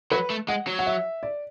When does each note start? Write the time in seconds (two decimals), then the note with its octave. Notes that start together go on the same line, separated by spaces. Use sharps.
0.11 F#3 B4
0.30 A3
0.48 G#3 F#5
0.67 F#3
0.79 F#5
0.87 E5
1.23 D5